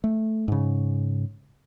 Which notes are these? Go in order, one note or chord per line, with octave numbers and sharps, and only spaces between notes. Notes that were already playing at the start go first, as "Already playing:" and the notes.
A3
G#2 C#3